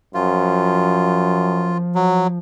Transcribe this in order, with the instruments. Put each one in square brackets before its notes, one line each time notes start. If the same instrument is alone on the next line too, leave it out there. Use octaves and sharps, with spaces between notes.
[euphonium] F#2 [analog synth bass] F3 [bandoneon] F4
[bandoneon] F#3